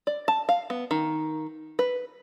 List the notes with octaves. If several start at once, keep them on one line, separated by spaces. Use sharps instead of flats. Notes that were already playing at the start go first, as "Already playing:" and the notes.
D5
A5
F5
B3
D#3
B4